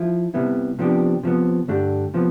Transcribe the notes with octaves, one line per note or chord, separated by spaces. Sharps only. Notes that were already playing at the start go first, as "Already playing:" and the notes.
Already playing: F3 E4
C3 G3 B3 E4
C3 F3 B3 D4 G4
C3 F3 B3
G2 D3 A3 D4 G4
C3 F3 B3